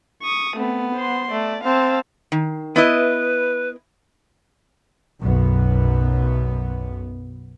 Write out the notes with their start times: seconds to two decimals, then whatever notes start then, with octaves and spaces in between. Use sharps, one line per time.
0.23 C#6 D#6
0.57 A3 B3 C4
0.95 C5 C6
1.31 A3 D5
1.64 C4 F5 A5
2.32 D#3
2.76 B3 E4 B4 D#5
5.21 B1 F#2 B3